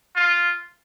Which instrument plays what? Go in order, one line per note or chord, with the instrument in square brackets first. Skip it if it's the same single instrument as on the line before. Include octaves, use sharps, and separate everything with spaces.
[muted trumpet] F4